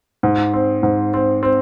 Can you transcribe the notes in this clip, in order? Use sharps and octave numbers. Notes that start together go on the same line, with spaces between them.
G#2
C4
G#2
C4
C4